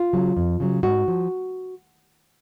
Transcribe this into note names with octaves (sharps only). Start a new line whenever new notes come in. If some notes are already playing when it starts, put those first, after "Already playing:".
Already playing: F4
C#3 F#3
F2
C#3 F#3
G#2 F#4
F3